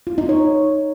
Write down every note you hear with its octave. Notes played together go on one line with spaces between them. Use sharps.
F4
D#4
C#5